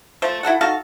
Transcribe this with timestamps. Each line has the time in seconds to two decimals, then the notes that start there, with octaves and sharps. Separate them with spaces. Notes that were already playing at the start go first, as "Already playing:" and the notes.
0.22 F3 A3 C5
0.43 E4 F#4 A4 F#5
0.61 D#4 F#4 A4 F5